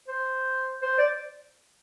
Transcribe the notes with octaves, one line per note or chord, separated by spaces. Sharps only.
C5
C5
D5